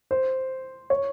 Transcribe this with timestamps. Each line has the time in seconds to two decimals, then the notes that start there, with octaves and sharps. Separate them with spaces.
0.11 C5
0.90 C#5